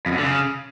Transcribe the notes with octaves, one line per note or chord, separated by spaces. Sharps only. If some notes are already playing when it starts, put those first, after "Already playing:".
F2
F#2
D3
C#3